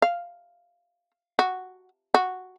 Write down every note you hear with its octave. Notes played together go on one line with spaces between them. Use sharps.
F5
F#4
F#4